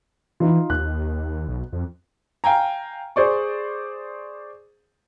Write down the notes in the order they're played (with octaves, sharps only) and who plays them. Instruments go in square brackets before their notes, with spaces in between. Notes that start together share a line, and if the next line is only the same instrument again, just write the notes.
[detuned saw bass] E3 [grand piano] D#4 F4
[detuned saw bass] D#2 [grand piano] F#6
[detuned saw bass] B1
F2
[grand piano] F5 G5 G#5 A#5
G#4 C5 D5 C#6